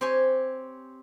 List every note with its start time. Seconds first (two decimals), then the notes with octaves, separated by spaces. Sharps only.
0.01 C4 G4 C5 C#5 G#5